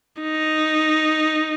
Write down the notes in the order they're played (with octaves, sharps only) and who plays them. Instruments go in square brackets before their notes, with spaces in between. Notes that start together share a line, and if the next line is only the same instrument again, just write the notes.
[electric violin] D#4